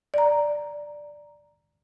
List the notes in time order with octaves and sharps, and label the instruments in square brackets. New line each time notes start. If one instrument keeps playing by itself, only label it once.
[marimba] D5 A#5